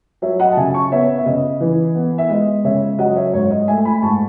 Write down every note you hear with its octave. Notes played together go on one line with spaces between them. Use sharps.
F#3 C#5 E5
D#5 F#5
A5
C#3 E5 G#5
A5 C#6
B3 C#5 E5
E5
C#3 D#5
E3
B3
E5
G#3 D#5
C#3 C#5 E5
F#3 D#5 F#5
C#5 E5
G#2 C#5
D#5
A3 E5 G#5
G#5 B5
G#2 A5 C#6